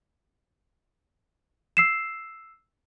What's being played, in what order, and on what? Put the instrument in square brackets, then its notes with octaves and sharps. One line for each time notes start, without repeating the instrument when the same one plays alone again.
[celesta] E6 C7 E7